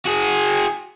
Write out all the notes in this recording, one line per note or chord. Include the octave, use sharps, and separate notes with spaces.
F#4 G#4